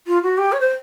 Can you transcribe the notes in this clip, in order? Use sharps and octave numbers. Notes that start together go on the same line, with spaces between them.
F4
F#4
G4
C#5
C5